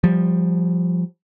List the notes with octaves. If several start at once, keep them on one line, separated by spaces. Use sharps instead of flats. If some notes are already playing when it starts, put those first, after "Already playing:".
F3 G3